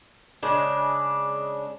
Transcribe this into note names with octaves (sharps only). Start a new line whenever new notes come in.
C#3 G#3 D4